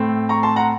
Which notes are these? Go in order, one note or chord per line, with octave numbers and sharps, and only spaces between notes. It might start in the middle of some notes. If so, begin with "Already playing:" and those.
Already playing: A2 A3 C4
A#5 C#6
A5 C6
F#5 A#5